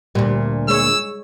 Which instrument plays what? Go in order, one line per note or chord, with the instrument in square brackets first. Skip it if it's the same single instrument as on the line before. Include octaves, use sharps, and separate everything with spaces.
[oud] D2 A#2 [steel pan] G3
[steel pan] G#3 C#5 [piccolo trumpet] E6